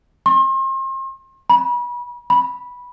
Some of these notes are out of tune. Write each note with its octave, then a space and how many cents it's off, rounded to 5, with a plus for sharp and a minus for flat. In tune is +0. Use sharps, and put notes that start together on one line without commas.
C6 +40
B5 -30
B5 -10